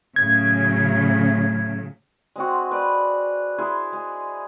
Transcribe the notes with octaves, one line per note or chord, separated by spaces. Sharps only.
A2 C#3 F#3 G#6
G#3 C4 F#4
B4 D5
E4 G#4 C6
G#3